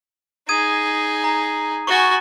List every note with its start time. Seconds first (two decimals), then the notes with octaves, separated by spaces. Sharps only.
0.49 D#4 G#4 D#6 G#6 D#7
1.24 A#5
1.87 F#4 G#5 C#6 A6